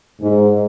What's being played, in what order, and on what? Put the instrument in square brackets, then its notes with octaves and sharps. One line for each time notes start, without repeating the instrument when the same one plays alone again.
[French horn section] G#2